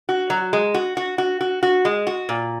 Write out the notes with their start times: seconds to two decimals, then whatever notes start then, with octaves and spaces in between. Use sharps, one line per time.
0.09 F#4
0.30 F#3
0.53 G#3
0.74 F#4
0.97 F#4
1.18 F#4
1.41 F#4
1.63 F#4
1.85 G#3
2.07 F#4
2.29 A#2